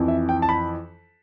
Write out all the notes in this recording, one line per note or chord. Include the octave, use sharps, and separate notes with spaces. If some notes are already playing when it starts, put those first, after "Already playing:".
Already playing: F2 E3
E5
G5
A5
B5